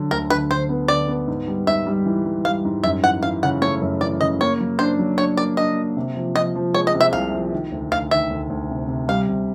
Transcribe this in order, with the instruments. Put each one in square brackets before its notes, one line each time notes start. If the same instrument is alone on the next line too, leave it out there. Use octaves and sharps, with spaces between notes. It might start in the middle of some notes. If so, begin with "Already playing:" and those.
Already playing: [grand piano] D3 F#3
[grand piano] D2 [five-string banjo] A#4
[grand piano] D3 [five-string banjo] B4
[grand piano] D3 [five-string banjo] C5
[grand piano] B3
[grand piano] D3 [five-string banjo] D5
[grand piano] B3
G#2
G3
[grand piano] G#2 [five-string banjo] E5
[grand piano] G3
E3
G3
[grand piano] G3 [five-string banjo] F5
[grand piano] G#2
[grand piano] F#2 [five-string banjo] E5
[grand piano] E3 [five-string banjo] F#5
[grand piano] E3 [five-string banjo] F5
[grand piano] C#3 [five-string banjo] F#5
[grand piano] A3 [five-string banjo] C#5
[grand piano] F#2
[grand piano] E3 [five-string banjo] D5
[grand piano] C#3 [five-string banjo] D#5
[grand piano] A#3 [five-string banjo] C#5
[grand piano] F#3
[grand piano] D4 [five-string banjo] C5
[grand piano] F#3
[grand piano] D4 [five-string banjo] C#5
[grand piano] A#3 [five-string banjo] D5
[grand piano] D4 [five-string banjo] D#5
[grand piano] A#3
C3
F3
[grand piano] F3 [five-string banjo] D#5
[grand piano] F3
[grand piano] G#3 [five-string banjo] C#5
[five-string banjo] D#5
[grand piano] C3
[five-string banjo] E5
[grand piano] C2 [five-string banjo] F5
[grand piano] F3
D#3
D2
[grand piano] D2 [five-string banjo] F5
[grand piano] D#3 [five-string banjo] E5
[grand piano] D2
D2
C3
C3
[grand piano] G3 [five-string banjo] F5
[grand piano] C3